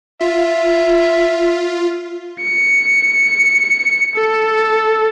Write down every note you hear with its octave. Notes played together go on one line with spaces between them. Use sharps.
F4 E5
C#7
A4